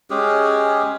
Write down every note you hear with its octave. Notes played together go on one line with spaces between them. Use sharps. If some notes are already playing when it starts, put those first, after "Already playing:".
G#3 C#4 G4 G#4